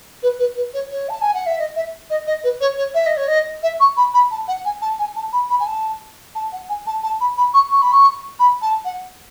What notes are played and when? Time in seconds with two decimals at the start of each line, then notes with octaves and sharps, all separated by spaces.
0.22 B4
0.39 B4
0.56 B4
0.73 C#5
0.90 C#5
1.08 A5
1.21 G#5
1.33 F#5
1.46 E5
1.58 D#5
1.75 E5
2.09 D#5
2.26 D#5
2.43 B4
2.60 C#5
2.77 C#5
2.94 E5
3.06 D#5
3.16 C#5
3.27 D#5
3.62 E5
3.79 C#6
3.96 B5
4.13 B5
4.30 A5
4.47 F#5
4.64 G#5
4.81 A5
4.98 G#5
5.15 A5
5.32 B5
5.49 B5
5.59 G#5
5.66 A5
6.34 A5
6.52 F#5
6.68 G#5
6.86 A5
7.03 A5
7.20 B5
7.37 B5
7.53 C#6
7.71 C#6
7.81 B5
7.92 C#6
8.39 B5
8.61 A5
8.84 F#5